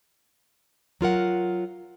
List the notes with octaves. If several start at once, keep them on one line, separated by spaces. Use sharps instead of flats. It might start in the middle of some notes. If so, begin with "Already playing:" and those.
F#3 F4 A#4 F#5